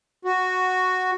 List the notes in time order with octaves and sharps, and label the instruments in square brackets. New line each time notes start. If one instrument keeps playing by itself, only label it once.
[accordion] F#4